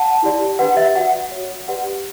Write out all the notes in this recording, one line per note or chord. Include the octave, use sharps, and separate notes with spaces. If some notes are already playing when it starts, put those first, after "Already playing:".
Already playing: F#5 A5
E4 G4 D5
D4 G4 B4 F#5
E5
F#4 B4 D5 F#5
F#4 C#5
G4 B4 D5 F#5